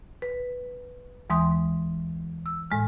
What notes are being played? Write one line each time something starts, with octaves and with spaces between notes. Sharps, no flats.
B4
D#2 E3 G#3 C6 D#6
E6
A2 G#3 F6